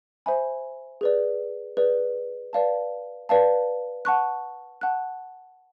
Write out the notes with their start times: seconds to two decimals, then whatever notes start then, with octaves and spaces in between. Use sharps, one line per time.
0.26 C5 E5 G#5 B5
1.01 G#4 B4 D5
1.77 G#4 B4 D5
2.53 B4 D5 F5 A5
3.29 B4 D5 F5 A5
4.05 F#5 A5 C#6 F#6
4.81 F#5 A5 C#6 F#6